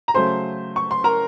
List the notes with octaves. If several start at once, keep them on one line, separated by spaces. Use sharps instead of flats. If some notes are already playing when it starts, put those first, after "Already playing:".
A#5
C#3 F#3 A3 C5 C6
C#6
C6
A#4 A#5